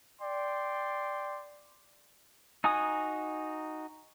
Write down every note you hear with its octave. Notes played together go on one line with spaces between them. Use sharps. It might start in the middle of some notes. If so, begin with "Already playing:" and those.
D5 G5 C6
D#4 F#4 G#5 A#5 D#6